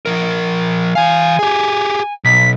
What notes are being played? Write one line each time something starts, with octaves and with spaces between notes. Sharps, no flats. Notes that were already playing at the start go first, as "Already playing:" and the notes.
F3 A#4
E3 F5 G#5
G4 G#4
B1 B6